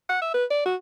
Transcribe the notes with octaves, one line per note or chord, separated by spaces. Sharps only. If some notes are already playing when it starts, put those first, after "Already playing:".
F#5
E5
B4
D5
F#4